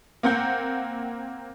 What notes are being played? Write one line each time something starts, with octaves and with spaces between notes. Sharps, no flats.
A#3 C4 F#5 G6